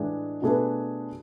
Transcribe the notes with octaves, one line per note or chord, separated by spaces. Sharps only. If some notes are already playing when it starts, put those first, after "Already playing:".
Already playing: A2 E3 G#3 D4 G#4
B2 A3 D4 G#4 B4